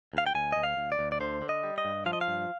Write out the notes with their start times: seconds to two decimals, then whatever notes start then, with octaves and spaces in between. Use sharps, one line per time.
0.13 D2 F5
0.26 G5
0.35 D2 G#5
0.52 D2 D#5
0.63 F5
0.77 D2
0.92 D5
0.99 D2
1.12 D5
1.20 D3 C5
1.42 D3
1.49 D#5
1.63 G3
1.78 D#5
1.85 G2
2.06 F3 F5
2.13 D#5
2.21 F5
2.28 G2